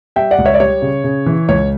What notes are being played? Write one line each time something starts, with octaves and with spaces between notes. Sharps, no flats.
G3 E5 G5
D5 F#5
C#2
C#5 E5
D5
G3 C#5
C#3
C#3
E3
C#2 C#5